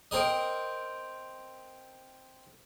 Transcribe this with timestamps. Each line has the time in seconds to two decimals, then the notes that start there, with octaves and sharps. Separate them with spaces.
0.11 C4 A#4 D#5